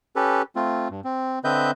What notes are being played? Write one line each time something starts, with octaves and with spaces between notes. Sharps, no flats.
C#4 G4 A4 B4
A3 C4 F4
G2
C4
D3 C4 B4 D#5 E5 G6